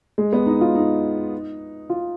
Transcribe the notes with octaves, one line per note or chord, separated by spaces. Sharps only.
G#3
B3
D#4
F4
D#4
F4